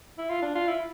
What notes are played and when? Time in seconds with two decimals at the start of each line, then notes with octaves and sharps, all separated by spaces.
0.18 E4
0.29 F4
0.42 D4
0.55 F4
0.68 E4